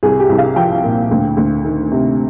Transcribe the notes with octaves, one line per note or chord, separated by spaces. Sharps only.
C2 G#4
G4
C2
F5
F3 G5
A#2
D2
D2
D#3
C3